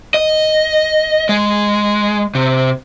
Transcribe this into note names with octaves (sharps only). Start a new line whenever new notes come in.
D#5
G#3
C3